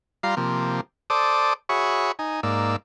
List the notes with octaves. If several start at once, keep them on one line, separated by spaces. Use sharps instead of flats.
G3 F4 F5 A#5 C6
C3 F3 A#3
A4 C5 D5 D6 D#6
F#4 G#4 C#5 E5 B5 C#6
D#4 G#5
G#2 A#3 D5 E6